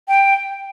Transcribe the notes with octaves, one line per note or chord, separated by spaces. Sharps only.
G5